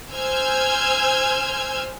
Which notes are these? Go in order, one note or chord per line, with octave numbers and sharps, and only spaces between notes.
C5 G#5 E6 F6 G6 G#6